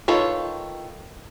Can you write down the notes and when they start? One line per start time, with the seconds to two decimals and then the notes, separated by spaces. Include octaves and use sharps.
0.08 D#3 F4 A4 B4 C#5